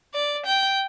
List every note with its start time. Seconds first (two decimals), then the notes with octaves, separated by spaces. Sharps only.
0.14 D5
0.46 G5